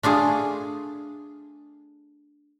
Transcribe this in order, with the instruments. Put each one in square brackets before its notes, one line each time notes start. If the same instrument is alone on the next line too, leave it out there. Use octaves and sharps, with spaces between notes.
[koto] A3 D4 F4 G#4